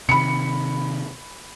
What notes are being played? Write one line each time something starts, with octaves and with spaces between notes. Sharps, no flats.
C3 D#3 B5 C#7